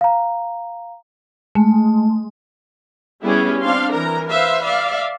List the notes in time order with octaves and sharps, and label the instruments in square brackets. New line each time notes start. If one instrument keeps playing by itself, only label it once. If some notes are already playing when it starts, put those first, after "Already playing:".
[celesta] F5 A#5
[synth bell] G#3 [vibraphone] A3
[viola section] G3 B3 C#4 E4 G4 G#4
C4 D4 F5 C6
E3 A#4 A#5
B4 C5 E5 F5
D5 E5 F5